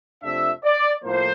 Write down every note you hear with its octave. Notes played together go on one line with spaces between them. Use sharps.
F2 C3 F3 A3 D4 E5
D5
A2 F3 A#3 C5